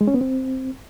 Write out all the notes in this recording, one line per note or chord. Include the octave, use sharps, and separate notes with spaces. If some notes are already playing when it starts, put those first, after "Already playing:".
G#3
C#4
B3
C4